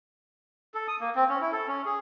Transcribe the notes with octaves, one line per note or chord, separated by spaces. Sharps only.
A4
D#6
A#3
C4
C#4
E4
A4
C#4
G#4